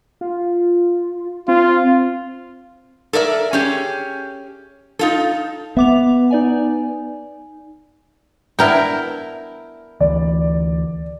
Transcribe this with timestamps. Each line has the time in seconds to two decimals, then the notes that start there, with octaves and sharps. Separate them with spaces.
0.21 F4
1.48 C4 F4
3.13 A4 A#4 D5 E5
3.53 C#4 G4 G#4
4.99 D#4 F4 A4
5.77 B3 E5 D6 F7
6.31 D#4 D5 G#5
8.59 B3 D4 E4 A#4 G5
10.00 D2 E3 D5